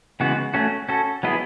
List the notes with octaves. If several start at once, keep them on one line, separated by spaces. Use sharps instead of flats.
C#3 E3 G#3 B3 F#4
A3 C#4 F#4
C#4 F#4 A4
F#3 B3 E4 G#4 D#5